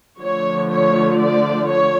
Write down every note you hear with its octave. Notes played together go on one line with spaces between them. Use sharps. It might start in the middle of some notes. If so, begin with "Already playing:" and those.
D3 F3 A3 C#5
C#5
D5
C#5